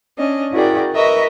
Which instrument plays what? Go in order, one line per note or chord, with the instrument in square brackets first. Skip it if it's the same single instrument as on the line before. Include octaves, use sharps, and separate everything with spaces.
[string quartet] C#4 D4 D#5
E4 F#4 G#4 A#4 D5 G5
A#4 B4 D#5 E5 C#6